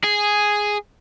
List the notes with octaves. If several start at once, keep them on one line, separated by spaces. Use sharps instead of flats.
G#4